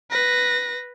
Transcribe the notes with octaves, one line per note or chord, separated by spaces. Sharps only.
B4 A#6